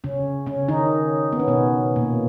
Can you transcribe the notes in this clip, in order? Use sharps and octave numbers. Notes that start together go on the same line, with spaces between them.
C#3 C#4
C#3 C#4
D#3 D#4
B3
C#4
B2 B3
A#2 A#3